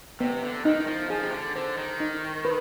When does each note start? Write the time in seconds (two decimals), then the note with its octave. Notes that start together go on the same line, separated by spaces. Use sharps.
0.20 C3 B3
0.44 D3
0.65 D#3 D#4
0.88 F3
1.10 F3 G#4
1.22 C3
1.32 D3
1.56 D3 C5
1.78 D#3
2.00 D#4
2.45 B4